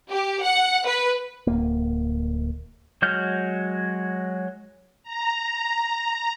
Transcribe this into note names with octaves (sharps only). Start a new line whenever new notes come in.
G4
F#5
B4
D1 A#3
F#3 G#3 F#4 F6 G6
A#5